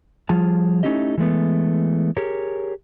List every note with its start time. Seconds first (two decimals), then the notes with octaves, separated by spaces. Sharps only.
0.29 F3 G3 F4 G#4 A5
0.83 A3 C#4 D#4 E4 G4 D#5
1.18 E3 G#3 A3 B3
2.17 G4 G#4 A#4 C#5